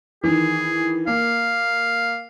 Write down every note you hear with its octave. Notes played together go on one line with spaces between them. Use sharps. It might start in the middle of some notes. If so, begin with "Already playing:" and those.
D#3 E3 G#4
A#3 F5